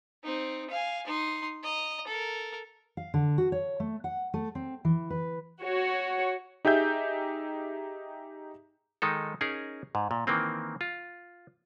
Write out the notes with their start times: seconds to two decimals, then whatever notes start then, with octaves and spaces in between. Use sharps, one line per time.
0.24 C4 D#4
0.70 F5 G#5
1.07 D#4 C6
1.64 D#5 A#5
2.07 A4 A#4
2.97 F5
3.14 D3
3.38 F#4
3.52 C#5
3.80 A3
4.04 F#5
4.34 A3
4.55 C4
4.85 E3
5.10 B4
5.63 F#4 C#5
6.65 D#4 G4 G#4 E5 G6
9.02 D#3 G#3 D#4 A4
9.41 C#4 D#4 G#4 A#4
9.95 G#2
10.11 A#2
10.27 D#3 E3 A#3 C4
10.81 F4